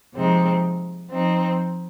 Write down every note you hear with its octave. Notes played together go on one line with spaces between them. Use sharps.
C3 F3 G#3 C4 D#4
F3 C4 D#4